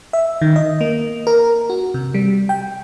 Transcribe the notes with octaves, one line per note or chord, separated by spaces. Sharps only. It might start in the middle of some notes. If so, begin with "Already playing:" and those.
E5
D#3
D#5
A#3
A#4
F#4
C3
G3
G5